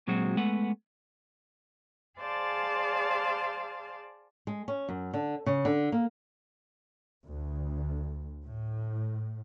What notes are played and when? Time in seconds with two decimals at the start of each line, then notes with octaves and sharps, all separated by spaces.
0.07 A#2 F#3 G#3 C4 F#4
0.37 G#3 A3 B3 F#5
2.19 G#4 C5 D5 F5 A5
4.47 G#3
4.68 C#4
4.89 F#2
5.14 D3
5.46 C#3
5.65 D3
5.92 A#3
7.25 D2
8.44 A2